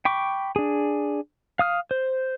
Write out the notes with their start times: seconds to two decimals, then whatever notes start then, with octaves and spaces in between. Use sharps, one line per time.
0.05 G5 B5 C#6 D6
0.56 D4 G#4
1.59 F5 D#6 F6
1.91 C5